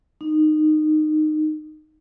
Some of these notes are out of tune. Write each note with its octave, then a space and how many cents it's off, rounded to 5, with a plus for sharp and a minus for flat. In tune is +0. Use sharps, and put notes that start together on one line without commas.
D#4 -15